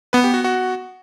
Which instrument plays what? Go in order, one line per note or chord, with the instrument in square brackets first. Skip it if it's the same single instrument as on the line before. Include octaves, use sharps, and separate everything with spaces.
[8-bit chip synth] B3 [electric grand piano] B4
[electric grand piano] G4
F#4
F#4